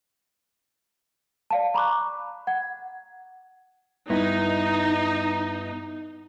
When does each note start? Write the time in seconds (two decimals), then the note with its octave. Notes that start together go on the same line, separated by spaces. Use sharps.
1.51 D5 F5 A5
1.74 A#5 B5 C#6 D6 F#6
2.47 F#5 G#6
4.10 G2 B3 D#4 E4